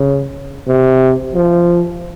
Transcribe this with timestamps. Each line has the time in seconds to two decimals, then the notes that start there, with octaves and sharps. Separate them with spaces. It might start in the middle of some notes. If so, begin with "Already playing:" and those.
Already playing: C#3
0.67 C3
1.34 F3